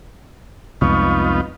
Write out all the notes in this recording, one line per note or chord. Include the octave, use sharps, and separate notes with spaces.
C2 F2 G#3 B3 D#4 F4 C#6